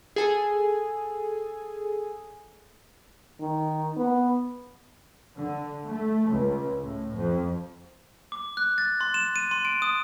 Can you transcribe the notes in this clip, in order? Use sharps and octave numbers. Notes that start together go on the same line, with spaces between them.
G#4 A4 G#5
D#3
B3
D3
A3
C#2
A2
F2
D6
F#6
A6
C6
E7
D#7
C6
D7
D#6